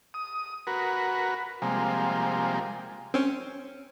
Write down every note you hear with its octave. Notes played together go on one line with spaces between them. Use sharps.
D#6
F#4 A#4 B4
C3 F3 G3 G#3 A#3
C4 C#4